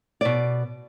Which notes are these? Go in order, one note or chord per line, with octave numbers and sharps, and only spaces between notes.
B2 D5